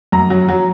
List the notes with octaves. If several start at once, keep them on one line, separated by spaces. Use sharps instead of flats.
F#2 A#5
F#3
F#3